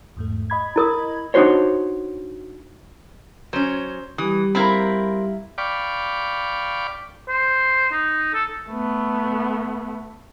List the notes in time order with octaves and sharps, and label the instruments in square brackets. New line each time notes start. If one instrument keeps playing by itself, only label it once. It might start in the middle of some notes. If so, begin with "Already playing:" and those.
[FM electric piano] E2 G#2 A3
D#5 B5 G#6
[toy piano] E4 A#4 D#6
[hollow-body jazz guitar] D4 D#4 F4 F#4 C5 C#5
[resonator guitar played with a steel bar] F#3 C#4 [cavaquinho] C5
[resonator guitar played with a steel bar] E3 [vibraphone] G3 G4 [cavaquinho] D#6
[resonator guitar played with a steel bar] C4 A#4 [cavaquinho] E4 F5 B5
[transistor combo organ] D5 F5 G5 B5 C#6 D6
[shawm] C5
D#4
A4
[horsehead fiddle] A3 B3